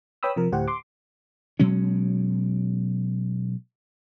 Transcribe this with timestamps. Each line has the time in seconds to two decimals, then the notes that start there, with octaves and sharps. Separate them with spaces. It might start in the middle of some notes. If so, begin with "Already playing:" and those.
0.23 B4 C#5 G5 B5 D#6 E6
0.36 C3 F3 A#4
0.52 D2 A2 G4 C5 F#5
0.68 C6 D6
1.59 B2 F#3 G#3 C#4